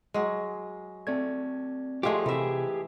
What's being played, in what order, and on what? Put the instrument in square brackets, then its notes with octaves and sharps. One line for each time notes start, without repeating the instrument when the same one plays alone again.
[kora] F#3 G#3
[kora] A3 [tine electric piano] C4 D5 G#6
[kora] F3 G#3 A3 [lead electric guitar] G4 G#4
[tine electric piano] C3 [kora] E3 E5